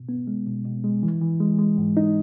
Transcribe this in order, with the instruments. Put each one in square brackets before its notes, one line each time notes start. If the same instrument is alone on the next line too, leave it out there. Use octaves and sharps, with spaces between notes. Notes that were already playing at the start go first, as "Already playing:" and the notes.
Already playing: [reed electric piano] B2
B3
G#3
B2
B2
G#3
E3
E3
G#3
G#3
G#2
D#4